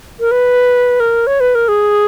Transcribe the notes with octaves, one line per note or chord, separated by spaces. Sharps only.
A#4
B4
A#4
C#5
B4
A#4
G#4